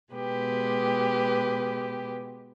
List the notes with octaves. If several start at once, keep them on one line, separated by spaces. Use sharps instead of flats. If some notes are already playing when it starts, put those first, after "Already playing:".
B2 G#3 G4 B4